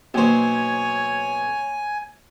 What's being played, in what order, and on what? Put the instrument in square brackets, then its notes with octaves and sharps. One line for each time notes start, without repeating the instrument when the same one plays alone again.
[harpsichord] B1 C5 [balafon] A#3 [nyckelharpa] C#5 [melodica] G#5